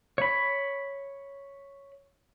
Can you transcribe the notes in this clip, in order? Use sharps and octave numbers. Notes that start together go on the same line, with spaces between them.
C#5 B5